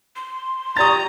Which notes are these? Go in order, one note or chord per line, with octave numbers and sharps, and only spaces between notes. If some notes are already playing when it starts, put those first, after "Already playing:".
C6
D#4 G4 D5 A#5 C#6 D#6 A6